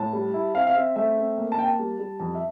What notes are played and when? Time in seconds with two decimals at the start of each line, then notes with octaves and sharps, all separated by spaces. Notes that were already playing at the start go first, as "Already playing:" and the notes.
Already playing: A2 A5
0.13 G3
0.34 E4
0.55 C4 F5
0.67 F5
0.75 C4 E5
0.96 A3 E5
1.17 C4
1.38 A#3
1.52 A5
1.58 A#3 G5
1.65 A5
1.79 G3
1.99 G3
2.20 F2 A5
2.35 E5